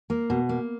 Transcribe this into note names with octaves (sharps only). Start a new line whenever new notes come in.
A#3
B2
A#3